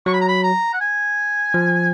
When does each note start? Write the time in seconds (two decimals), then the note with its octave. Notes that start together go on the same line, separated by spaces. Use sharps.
0.06 F#3 C#6
0.13 B5
0.21 A#5
0.28 B5
0.43 A#5
0.73 F#5
0.81 G#5
1.54 F3